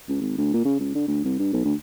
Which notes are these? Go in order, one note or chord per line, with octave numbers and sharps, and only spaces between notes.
C#2
G#1
D2
A#2
C#3
C#2
D3
D2
C2
G2
B1
D2